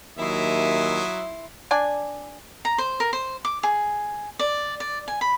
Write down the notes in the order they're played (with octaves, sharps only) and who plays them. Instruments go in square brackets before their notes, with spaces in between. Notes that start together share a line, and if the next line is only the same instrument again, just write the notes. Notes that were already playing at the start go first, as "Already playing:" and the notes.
[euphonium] D#2 [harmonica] F#3 E5 D#6 [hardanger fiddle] E4 C6
[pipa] D4 D5 G#5
[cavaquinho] A#5
C5
A#4
C5
D6
G#4
D5
D5
G#5
B5